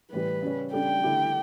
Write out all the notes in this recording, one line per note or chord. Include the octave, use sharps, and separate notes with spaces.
A2 E3 G3 B4
C#3 G3 C#4
C#3 G3 D4 A4 G5
D3 A3 E4 G4